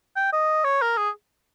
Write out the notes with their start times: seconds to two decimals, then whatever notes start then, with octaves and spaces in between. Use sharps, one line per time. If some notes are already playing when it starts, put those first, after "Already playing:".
0.16 G5
0.33 D#5
0.64 C#5
0.82 A#4
0.97 G#4